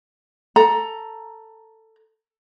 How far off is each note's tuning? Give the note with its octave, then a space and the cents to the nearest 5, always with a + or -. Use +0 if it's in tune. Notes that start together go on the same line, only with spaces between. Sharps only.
A4 +15 A#5 +10